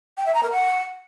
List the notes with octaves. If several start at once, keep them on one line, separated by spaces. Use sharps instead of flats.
G5
E5
A#5
A#4
F#5